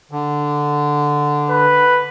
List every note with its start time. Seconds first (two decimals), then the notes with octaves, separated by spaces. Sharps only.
0.11 D3
1.50 B4